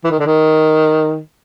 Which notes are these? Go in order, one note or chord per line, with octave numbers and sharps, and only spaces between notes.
E3
D#3
D3
D#3